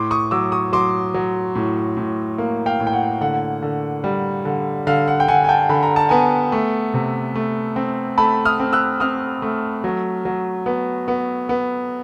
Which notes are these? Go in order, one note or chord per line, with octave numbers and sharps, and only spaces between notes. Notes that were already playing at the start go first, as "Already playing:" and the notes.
Already playing: A2 C6 D6
C#6 D#6
F#3 D6 E6
C#6 D#6
F#3 C6 D6
F#3
A2
A2
A#3
F5 G5
A2
G5
F#5
D3 F#5
D3
G3
D3
D3 F5
F#5
G5
D3 F#5 G#5
G#5
G5 A5
D3 B5
A#5
A5
B3 G#5 A#5
A3
C3
A3
C4
A3 A5 B5
D#6 F6
C4
E6 F#6
C4 D#6 F6
A3
F#3
F#3
B3
B3
B3